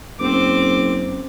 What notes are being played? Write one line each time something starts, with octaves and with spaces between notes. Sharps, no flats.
F#1 C4 D6